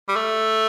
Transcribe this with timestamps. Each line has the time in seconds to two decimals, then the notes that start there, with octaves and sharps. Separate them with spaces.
0.08 G3
0.16 A3